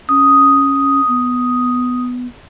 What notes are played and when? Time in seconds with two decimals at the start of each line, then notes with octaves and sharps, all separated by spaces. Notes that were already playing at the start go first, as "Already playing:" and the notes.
0.09 C#4 D#6
1.08 B3